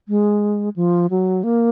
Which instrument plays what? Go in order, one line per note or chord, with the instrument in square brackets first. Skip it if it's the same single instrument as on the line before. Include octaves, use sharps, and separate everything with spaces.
[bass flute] G#3
F3
F#3
A#3